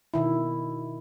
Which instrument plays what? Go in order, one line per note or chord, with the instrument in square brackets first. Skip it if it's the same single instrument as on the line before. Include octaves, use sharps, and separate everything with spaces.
[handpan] B2 D#3 E4